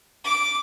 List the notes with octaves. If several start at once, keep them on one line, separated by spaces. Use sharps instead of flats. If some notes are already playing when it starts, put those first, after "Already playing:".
D6